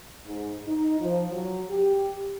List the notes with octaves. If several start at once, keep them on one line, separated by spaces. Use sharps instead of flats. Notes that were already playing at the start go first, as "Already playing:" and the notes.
G#2
D#4
F3
F#3
G4